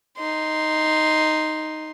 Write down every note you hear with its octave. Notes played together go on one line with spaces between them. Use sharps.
D#4 C6